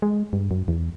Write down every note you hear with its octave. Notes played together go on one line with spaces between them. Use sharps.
G#3
G2
F#2
E2